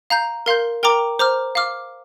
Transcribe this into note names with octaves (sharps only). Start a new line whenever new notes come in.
F5 A#5 G6
A#4 F5 C6 G6
A#4 G5 A#5 D6
C5 A#5 D6 F6
F5 D6 F6